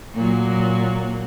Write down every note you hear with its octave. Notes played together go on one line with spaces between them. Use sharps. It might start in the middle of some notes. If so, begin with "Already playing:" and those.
A#2 F#3 A#3